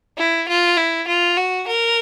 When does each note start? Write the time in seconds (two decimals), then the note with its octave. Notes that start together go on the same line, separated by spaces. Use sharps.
0.18 E4
0.48 F4
0.77 E4
1.07 F4
1.36 F#4
1.67 A#4